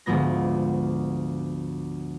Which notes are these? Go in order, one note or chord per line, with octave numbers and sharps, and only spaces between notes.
D2 G#2 F3 B3 A#6